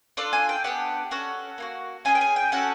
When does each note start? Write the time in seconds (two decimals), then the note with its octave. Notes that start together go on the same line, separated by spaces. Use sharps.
0.17 D4 F4 A4 D5
0.33 G#5
0.49 G5
0.64 B3 D4 G4 F#5
1.11 C#4 F#4 A4 F#5
1.58 A#3 D#4 F#4
2.05 C#4 E4 G#4 G#5
2.15 G5
2.21 G#5
2.36 G5
2.52 C#4 F#4 A4 F#5